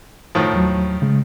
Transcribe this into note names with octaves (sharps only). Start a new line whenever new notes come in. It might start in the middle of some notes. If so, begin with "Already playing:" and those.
A2 D#3 F3
D#2 F#3
C#3 G#3